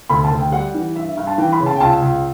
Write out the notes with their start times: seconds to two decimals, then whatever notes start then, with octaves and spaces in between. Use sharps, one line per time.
0.09 D2 B5
0.24 A5
0.31 D2
0.38 G5
0.52 G3 F#5
0.74 E3
0.95 G2 E5
1.17 G2
1.27 A5
1.38 E3 G5
1.52 B5
1.60 C#3
1.66 A5
1.74 G5
1.80 C#2 A5
2.02 C#2